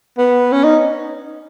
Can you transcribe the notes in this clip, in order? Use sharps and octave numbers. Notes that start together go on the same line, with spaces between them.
B3
C#4
D#4